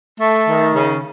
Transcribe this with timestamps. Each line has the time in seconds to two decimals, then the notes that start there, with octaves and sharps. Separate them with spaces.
0.20 A3
0.47 D#3
0.74 C#3